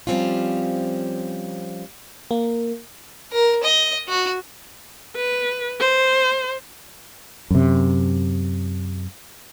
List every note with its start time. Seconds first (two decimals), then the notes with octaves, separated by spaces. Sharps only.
0.07 F3 G3 C4 C#4 F4
2.31 A#3
3.32 A#4
3.63 D#5
4.08 F#4
5.16 B4
5.80 C5
7.51 F#2 C3